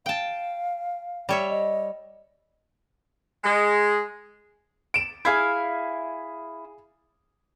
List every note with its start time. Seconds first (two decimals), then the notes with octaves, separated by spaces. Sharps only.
0.06 F5 G5 A5
1.29 G3 C#5 E5
1.49 D#5
3.44 G#3
4.94 D7 E7
5.25 E4 G#4 F5 G#6